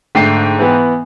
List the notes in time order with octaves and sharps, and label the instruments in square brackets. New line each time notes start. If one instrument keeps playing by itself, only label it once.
[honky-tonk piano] G#2 G5 C7 [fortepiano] D3 A3
[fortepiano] E3 B3